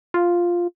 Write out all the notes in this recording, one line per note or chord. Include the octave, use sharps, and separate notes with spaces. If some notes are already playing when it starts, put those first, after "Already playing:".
F4